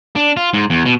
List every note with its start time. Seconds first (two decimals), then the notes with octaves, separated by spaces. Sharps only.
0.16 D4
0.37 F4
0.54 G#2
0.70 E2
0.86 B2